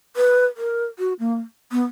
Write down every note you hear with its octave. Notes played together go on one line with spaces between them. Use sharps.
B4
A#4
F#4
A#3
B3